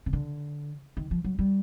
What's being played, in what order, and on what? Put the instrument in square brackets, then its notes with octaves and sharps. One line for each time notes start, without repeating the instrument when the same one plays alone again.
[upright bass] C#3
D3
D#3
F3
F#3
G3